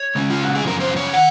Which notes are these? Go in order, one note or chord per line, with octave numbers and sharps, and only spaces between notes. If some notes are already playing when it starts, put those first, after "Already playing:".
Already playing: C#5
C#3 G#3 C#4
F4
F#4
G#4
F#2 C#3 F3 A#4
C5
C#5
D#3 F#5